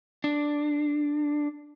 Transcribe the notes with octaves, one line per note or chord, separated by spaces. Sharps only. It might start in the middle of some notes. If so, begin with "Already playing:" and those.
D4